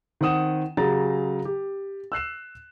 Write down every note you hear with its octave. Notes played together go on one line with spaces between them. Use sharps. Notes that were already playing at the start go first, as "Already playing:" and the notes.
D#3 C4 F#5 D#6 E7
C#3 F#3 G4 G#4 A#5 A6
G4
E6 F#6 C7 E7